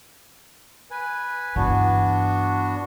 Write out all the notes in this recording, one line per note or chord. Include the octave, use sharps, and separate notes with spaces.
B4 G#5
G2 E3 B3 D4 F#4